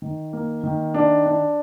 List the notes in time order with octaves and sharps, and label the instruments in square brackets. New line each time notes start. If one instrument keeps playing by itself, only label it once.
[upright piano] D#3
A#3
D#3
D4
D4